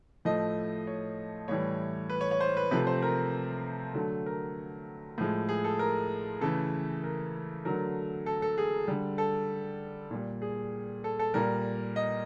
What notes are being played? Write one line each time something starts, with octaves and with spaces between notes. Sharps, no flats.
A2 F3 A3 D#5
C#5
A2 E3 G3 C#5
B4
C#5
C#5
C5
B4
C3 F3 A3 B4
C5
A#4
D3 F#3 A3
A#4
A2 F3 G#3
G#4
A4
A#4
C#3 E3 A3 A4
A#4
D3 F#3 A3 A#4
A4
A4
G#4
D3 G3
A4
A#2 G3
G#4
A4
A4
A#2 G3 A#4
D#5